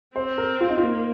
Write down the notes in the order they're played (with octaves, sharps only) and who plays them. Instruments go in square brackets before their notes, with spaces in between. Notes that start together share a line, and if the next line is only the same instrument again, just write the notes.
[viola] C4 [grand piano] C5
[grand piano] A#4
F4
D#4
F4
[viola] A#3